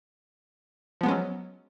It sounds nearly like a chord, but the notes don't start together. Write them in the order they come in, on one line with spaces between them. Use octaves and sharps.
F3 B3 G#3 C#4 F#3